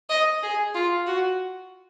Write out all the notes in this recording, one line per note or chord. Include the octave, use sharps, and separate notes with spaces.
D#5
G#4
F4
F#4